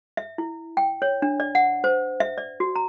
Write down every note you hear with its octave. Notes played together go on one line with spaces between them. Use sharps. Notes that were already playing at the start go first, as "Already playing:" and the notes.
E5
E4
G5
C#5
D4
D5
F#5
C5
E5
D5
F#4
A#5